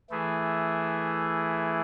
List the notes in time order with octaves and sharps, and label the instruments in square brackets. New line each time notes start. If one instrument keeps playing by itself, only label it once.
[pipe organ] E3 A3 E4 G#4